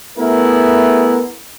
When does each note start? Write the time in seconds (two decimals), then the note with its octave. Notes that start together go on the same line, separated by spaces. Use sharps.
0.17 A3 B3 E4 G#4 A#4